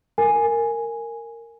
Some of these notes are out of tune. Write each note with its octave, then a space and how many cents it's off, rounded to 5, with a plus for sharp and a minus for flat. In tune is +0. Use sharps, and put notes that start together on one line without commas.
A#4 -15 G#5 +0